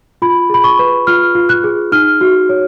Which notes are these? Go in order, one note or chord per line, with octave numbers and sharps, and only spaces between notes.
F4 B5
G#4 B5
C#6
B4
F4 F6
F4
F#6
G#4
D#4 F6
F#4
C#5